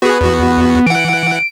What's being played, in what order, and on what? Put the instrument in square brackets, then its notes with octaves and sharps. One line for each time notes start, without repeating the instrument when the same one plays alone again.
[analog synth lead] B3 [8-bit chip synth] F#4 G#4
[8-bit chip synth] E2 F#4
[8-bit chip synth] E3 F#5 [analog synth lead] D7